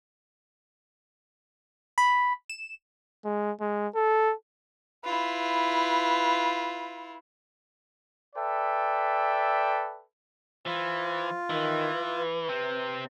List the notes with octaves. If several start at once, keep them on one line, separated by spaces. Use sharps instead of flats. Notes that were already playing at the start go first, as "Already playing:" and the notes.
B5
E7
G#3
G#3
A4
E4 F4 B4
A4 B4 D5 E5 G5
E3 F4 C5
D#3 E3
B4
C3 C4